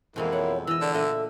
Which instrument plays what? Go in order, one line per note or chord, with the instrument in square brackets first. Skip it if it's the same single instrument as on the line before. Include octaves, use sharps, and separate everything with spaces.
[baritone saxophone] F2 [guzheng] B2 E3 G#3 [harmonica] A#3 E4
[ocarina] C#5 [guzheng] F#5
[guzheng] E3 D#5 [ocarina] E4 [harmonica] E6
[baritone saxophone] D3 [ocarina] D5
[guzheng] A#2 D4 D#5 [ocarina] A4 [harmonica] E5